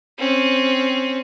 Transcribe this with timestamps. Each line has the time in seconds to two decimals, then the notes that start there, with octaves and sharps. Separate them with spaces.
0.18 C4 C#4